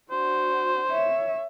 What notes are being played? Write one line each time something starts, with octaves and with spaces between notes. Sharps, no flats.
D4 F#4 C5
C#5 E5